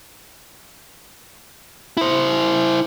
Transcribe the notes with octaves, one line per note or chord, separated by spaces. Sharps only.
E4 C5